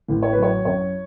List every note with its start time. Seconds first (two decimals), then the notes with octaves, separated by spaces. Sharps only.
0.08 A1
0.23 C#5
0.32 F#3 B4
0.42 C#5
0.65 F#2 C#5